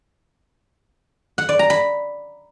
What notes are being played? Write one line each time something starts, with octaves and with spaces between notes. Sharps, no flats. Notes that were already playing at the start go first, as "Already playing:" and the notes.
F#5
D5
A#5
B5